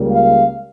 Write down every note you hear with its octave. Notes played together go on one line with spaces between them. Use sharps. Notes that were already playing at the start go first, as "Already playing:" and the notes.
Already playing: C#2 C#3 G3 A#3
F5